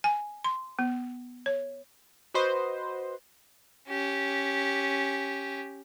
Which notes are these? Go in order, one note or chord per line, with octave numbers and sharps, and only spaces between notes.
G#5
C6
B3
C#5
F#4 B4 C5 D#5
C#4 G4